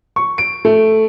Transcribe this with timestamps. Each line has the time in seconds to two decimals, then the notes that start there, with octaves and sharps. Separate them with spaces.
0.16 C#6
0.38 D7
0.65 A3